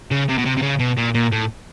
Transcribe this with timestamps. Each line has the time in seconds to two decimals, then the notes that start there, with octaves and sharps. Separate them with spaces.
0.11 C#3
0.28 C3
0.38 B2
0.45 C3
0.57 C3
0.62 C#3
0.79 B2
0.97 A#2
1.14 A#2
1.32 A2